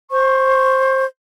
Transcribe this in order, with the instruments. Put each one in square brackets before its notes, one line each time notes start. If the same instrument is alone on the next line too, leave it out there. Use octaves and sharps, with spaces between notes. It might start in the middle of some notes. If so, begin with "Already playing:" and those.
[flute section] C5 C#6